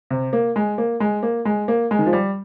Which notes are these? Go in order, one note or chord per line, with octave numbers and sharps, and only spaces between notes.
C3
A#3
G#3
A#3
G#3
A#3
G#3
A#3
G#3
D#3
F3
G3